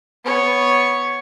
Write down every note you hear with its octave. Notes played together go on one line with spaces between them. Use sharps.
B3 C#5